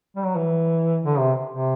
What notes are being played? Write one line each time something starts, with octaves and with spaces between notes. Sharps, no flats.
G3
F#3
E3
D3
C3
C3